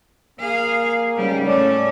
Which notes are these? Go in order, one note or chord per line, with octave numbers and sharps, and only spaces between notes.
A#3 G#4 F5
G#2 C#3 G3
A2 A3 C#4 C#5 D5